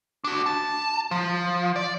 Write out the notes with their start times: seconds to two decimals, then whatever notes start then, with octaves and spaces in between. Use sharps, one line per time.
0.24 D4 F#4
0.46 A5
1.11 F3
1.76 D5